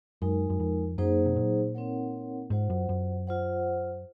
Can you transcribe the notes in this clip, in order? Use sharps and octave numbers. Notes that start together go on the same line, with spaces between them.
F#2 G#3 D#4 A#4
F#2
F2
F#2 F#3 A#3 D#4 G#4 C5
C3
A#2
C4 D#4 A#4 C#5 F#5
G#2 F4 C5 F#5
F#2
F#2
F4 C5 F#5